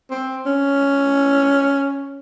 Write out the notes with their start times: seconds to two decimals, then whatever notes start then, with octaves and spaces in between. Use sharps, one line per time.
0.11 C4
0.46 C#4